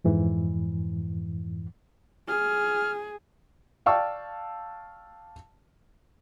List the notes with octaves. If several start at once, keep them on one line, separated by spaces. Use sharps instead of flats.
F2 G#2 E3
G#4 F6
D5 F5 G5 A5 C#6 E6